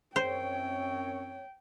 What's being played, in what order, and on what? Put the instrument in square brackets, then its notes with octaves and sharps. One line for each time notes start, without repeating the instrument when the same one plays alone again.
[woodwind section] F#2 C4 C#5 [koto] C5 [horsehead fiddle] G5